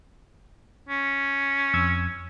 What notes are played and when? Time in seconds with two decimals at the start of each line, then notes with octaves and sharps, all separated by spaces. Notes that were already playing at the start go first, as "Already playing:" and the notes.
0.89 C#4
1.73 F2 E6 G#6